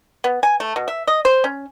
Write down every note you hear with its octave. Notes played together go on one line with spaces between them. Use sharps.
B3
G#5
A3
B2
E5
D#5
C5
C#4